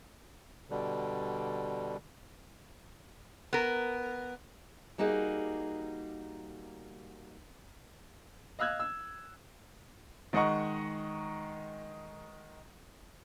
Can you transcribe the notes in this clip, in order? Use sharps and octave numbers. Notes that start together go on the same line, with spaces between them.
B2 D3 G3
B3 A#4
G3 A#3 D#4 F#4 G#4
D#5 F5 E6 F#6 G#6
E6
D#3 G#3 D#5 F#5 A#5 C#6